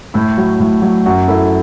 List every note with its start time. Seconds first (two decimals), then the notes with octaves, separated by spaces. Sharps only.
0.14 A2 E4
0.38 F#3
0.60 A2
0.82 F#3
1.06 F#2 F#4
1.28 F#3 E4 A4